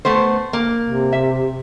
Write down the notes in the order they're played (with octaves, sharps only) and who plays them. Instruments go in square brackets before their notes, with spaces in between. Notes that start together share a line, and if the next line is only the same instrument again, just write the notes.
[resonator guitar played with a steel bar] A3 B3 C5
A#3
[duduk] C3
[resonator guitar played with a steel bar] E5